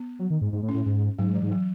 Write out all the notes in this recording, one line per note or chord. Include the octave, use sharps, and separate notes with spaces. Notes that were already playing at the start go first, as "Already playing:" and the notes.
Already playing: B3
F#3
D#3
G#2
G#2
A2
C#4
A2
G#2
G#2 F#3
E3
G#2
F#3